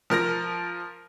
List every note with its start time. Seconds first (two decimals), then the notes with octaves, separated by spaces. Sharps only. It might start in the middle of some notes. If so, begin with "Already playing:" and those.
0.10 F3 A#4 F6 A#6